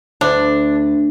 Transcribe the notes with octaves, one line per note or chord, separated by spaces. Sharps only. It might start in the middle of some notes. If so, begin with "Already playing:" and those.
D2 D4